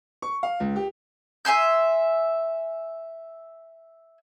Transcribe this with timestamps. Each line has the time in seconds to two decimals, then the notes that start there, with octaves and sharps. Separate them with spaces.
0.22 C#6
0.43 F5
0.60 C#2
0.76 G4
1.45 E5 G#5 C6 G6